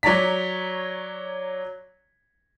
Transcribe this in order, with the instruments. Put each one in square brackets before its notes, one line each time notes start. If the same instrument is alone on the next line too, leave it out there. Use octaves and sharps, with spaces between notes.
[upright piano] F#3 C#5 D5 A#5 B6